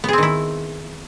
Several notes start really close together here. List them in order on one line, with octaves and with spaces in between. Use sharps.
B3 G#4 C4 D#3 E4